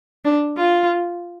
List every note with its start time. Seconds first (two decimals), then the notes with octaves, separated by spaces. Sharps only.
0.25 D4
0.57 F4